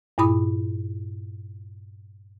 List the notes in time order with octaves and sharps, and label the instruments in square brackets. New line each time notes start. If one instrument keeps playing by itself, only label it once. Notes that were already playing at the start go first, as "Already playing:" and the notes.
[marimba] G2 A#2 E4 B5 D#6